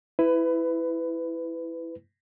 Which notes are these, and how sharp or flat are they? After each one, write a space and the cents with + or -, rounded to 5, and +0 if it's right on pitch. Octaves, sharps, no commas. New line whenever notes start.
E4 +0 B4 +20